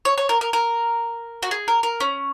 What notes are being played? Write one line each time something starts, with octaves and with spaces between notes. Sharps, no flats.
C#5
C#5
A#4
A#4
A#4
F#4
G#4
A#4
A#4
C#4